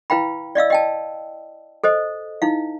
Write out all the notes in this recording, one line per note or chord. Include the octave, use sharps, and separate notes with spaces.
E4 B4 F5 G5 B5
D5 D#5 F5 E6
D#5 G5 A5
A4 C5 D#5
D#4 E4 F5